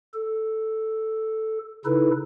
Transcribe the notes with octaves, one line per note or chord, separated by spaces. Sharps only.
A4
C#3 D#4 E4 A4 B4